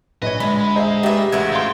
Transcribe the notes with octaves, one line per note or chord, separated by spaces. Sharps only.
A#1 B4 C#5 D#5
D3 G#3 B5
G#4 C5 D#5 E5 A#5
A#2 G4 B4 E5
A1 G#3 A3 F#4 E5 G#6
G4 F5 C6